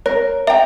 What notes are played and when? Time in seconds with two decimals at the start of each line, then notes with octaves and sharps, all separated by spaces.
0.06 A#4 C#5
0.47 E5 G5 A#5